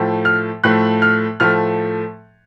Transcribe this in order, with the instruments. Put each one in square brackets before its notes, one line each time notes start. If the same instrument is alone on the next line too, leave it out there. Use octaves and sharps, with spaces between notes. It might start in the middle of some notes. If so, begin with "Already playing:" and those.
Already playing: [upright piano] A2 F3 A3
F6
A2 F3 A3 F#6
F6
A2 F3 A3 F6